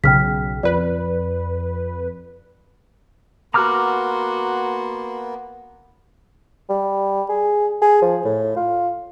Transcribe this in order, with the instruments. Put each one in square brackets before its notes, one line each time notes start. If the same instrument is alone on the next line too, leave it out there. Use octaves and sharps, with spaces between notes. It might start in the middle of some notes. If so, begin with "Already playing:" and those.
[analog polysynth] B1 C#3 [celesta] G5 F6 B6
[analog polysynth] F2 B4 [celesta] D5
[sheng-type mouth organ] A#3 B3 [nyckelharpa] F#4 C6 [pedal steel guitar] A#5 D6 F6
[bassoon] G3
G#4
G#4
F3
A2
F4